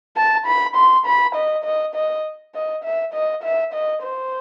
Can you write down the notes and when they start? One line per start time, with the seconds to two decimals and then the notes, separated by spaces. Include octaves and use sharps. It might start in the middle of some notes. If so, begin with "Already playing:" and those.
0.16 A5
0.46 B5
0.76 C6
1.06 B5
1.35 D#5
1.64 D#5
1.95 D#5
2.55 D#5
2.84 E5
3.14 D#5
3.43 E5
3.73 D#5
4.03 C5